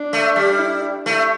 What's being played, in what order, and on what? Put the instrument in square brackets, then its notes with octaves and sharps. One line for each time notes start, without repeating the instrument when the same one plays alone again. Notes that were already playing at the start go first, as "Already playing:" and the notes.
Already playing: [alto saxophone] D4
[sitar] A3
G3
[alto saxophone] E4
D4
[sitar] A3 [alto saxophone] E4